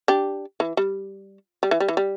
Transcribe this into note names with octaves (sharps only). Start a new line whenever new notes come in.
D4 G4
E3
G3
G3
E3
G3
E3
G3